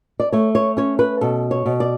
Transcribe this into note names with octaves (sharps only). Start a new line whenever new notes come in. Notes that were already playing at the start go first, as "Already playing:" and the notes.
D5
A3 C#5
C#5
C#4 C#5
B4
B2 A4
C#5
B2
D5